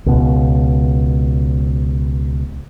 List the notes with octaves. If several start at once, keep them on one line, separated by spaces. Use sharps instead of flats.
C#2 B2